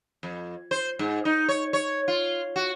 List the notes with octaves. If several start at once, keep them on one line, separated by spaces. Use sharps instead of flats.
F2
C5
G#2
D#4
C#5
C#5
F4
F#4